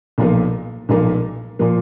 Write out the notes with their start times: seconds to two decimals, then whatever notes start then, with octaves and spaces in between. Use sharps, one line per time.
0.18 B1 A#2 F3 A#3
0.89 B1 A#2 F3 A#3
1.59 A#2 F3 A#3